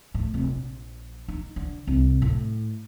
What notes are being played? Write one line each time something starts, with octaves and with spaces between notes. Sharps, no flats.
A2
F1
A#1
D#4
D3
C2
A2